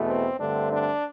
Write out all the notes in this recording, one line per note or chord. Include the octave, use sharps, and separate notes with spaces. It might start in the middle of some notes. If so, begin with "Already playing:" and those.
Already playing: E2 B2 A3
C4
G2 D3 A3 C4 D4
D4